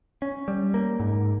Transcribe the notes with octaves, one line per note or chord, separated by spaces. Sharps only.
C#4
G3
A#3
G#2